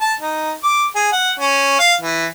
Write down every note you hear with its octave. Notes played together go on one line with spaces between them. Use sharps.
A5
D#4
D6
G#4
F#5
C#4
F5
E3